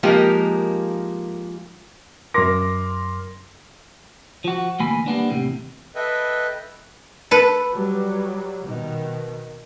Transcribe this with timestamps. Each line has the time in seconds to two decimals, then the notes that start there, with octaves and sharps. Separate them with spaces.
0.03 F3 G#3 A#3 D#4 G4 A#4
2.34 F#2 A#4 C6 D6 A#6
4.44 F3 F#4
4.79 D2 B2 E3 A#3 G#5 B5
5.06 G3 A#3 B3 D4
5.29 E2 A2 C3
5.95 A4 B4 D#5 E5 G5
7.31 A4 B4
7.71 F#3 G3
8.63 B2 D#3